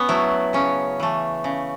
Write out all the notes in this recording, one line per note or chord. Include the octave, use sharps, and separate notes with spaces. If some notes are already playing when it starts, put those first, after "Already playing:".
Already playing: B3 C#4
F#3 A3 E4
C#3 C#4
E3 A3
C#3